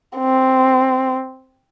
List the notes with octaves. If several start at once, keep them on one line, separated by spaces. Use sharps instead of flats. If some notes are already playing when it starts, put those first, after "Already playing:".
C4